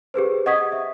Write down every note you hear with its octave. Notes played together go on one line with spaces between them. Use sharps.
G4 G#4 B4 C5
D#5 F#5 C#6 D#6 G#6 B6
E5